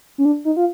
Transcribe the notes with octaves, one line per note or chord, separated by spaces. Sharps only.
C#4
D4
D#4
F4